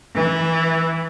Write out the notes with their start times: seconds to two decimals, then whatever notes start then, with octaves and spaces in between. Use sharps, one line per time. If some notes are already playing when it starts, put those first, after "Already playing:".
0.14 E3